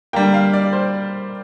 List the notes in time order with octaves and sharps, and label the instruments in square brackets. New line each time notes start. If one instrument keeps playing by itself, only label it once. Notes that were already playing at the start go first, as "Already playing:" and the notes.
[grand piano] D3 G3 A#3 G5
F5
D5
C5